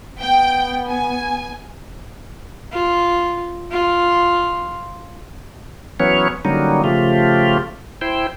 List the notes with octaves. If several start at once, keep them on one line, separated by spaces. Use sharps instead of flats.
B3 G5
G#5
F4
F4
E3 F#3 B3 C#4 C#5
D3 F#3 G3 A#3 C#4 D#4
C#3 F3 A3 F4 G4
E4 C5 G5